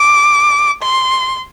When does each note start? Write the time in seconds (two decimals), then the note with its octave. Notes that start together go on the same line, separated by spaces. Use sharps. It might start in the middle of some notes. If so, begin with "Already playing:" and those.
Already playing: D6
0.83 C6